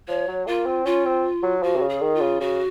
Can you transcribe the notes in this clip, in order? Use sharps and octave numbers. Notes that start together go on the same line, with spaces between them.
F3 C#5
F#3
A#3 F4
C4
C#4 F4
C4
F#3
F3 F#4
C3
C#3
G#4
D#3
F4
C#3
C#3 F#4